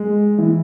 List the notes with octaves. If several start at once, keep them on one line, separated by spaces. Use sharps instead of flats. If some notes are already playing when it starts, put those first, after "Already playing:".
Already playing: G#3
E3